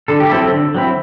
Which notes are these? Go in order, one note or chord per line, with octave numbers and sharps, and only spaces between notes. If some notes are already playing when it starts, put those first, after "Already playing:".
D3 A4
G4
F#3 C4 E4 A4
D3
F#3 C4 E4